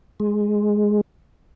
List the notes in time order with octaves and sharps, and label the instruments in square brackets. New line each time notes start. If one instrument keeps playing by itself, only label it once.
[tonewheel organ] G#3